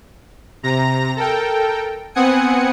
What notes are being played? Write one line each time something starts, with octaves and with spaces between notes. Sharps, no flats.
C3 A#5 A#6
A4 A#4 G5
B3 C4 F#5 G#5 D#6 C#7